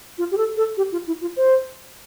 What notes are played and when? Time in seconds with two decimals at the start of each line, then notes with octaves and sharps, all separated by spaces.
0.18 F4
0.31 G4
0.37 A4
0.57 A4
0.77 G4
0.92 F4
1.07 E4
1.21 F4
1.36 C5